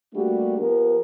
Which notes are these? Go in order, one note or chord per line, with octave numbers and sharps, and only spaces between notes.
G3 A3 A#3 D4 F#4 G4
F3 B3 G4 A#4